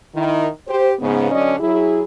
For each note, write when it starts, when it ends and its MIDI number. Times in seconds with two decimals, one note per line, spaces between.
0.15 0.48 51
0.15 0.48 64
0.67 0.90 67
0.67 0.90 72
0.99 1.30 44
0.99 1.30 49
0.99 1.30 59
1.31 1.55 50
1.31 1.55 54
1.31 1.55 61
1.31 1.55 62
1.31 1.55 74
1.31 1.55 75
1.60 2.01 54
1.60 2.01 64
1.60 2.01 68